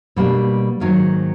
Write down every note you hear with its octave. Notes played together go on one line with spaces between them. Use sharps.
B2 G3 A#3 D4
G#2 D#3 F#3 A#3